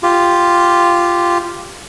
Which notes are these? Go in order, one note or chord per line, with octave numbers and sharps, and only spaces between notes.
F4 G4